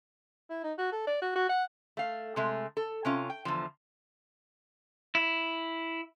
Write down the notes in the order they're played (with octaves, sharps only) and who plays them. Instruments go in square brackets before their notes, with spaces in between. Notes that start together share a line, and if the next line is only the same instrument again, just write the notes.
[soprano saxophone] E4
D#4
F#4
A4
D5
F#4
F#4
F#5
[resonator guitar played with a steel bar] A3 F5
C3 G#3 A3
A4
C3 C#4 F4
G5
E2 D3 F3
[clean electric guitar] E4